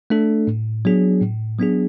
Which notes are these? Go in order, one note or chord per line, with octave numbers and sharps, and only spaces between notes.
A3 D4 A4
A2
F#3 B3 D4 G#4
A2
F#3 B3 D4 G#4